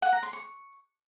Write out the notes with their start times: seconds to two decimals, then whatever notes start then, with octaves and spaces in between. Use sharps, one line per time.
0.02 F#5
0.13 A#5
0.23 C6
0.33 C#6